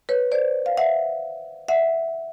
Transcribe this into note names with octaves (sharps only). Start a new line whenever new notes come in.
B4 C#5
C5 D5
F5
E5 F#5
E5 F#5